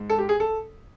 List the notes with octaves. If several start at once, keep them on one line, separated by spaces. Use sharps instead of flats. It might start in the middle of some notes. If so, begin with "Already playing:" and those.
Already playing: G#2
A4
G4
G#4
A4